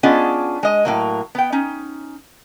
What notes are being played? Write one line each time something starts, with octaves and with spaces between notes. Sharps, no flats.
B3 C#4 D4 F4 G#4 D#5
G#3 D#5
A2 F#3 A#3
B3 G5
C#4 D#4